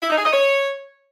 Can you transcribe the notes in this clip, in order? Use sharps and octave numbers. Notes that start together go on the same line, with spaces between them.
E4
D#4
G#4
D#5
C#5